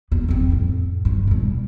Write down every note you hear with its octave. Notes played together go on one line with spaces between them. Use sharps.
E2 B3
C#3 C4
A1 F2
E2 G2
B2 G3